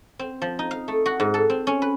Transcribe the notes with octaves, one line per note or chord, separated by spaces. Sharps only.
C4
F3
D#4
F5
A3
F#4
G#2
A4
C4
C#4
B4